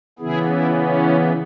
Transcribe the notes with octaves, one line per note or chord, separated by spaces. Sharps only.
C#3 E3 B3 E4 G#4
E4
C#4